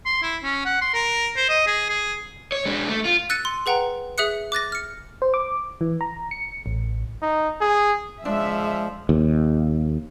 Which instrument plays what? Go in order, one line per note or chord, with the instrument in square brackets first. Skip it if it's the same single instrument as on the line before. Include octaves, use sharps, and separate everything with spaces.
[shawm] C6
E4
C#4
F#5
C6
A#4
C5
D#5
G#4
G#4
[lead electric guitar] C#5
G#3 D4
A3
F4
[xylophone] E6 F#6 A6 C#7 D#7
C6
G#4 B4 F#5 G5 A#5
G#4 E5 D#6 F#6 C#7
D6 F#6 A6 A#6
F6 C#7
[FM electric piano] C5
D6
E3
A#5
C#7
A1
[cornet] D#4
G#4
[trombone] F3 [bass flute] G#3 [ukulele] D4 [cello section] E5
[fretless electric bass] D#2